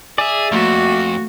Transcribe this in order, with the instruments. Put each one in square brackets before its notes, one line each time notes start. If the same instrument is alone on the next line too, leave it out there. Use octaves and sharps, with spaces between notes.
[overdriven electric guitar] G#4 [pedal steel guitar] D5 E5
[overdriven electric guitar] F2 [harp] A3 A#3 [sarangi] F#4